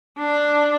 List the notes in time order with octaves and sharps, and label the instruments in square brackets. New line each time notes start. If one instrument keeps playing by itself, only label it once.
[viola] D4